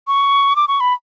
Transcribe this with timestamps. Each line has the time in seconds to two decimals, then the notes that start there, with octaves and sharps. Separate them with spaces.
0.07 C#6
0.56 D6
0.68 C#6
0.80 B5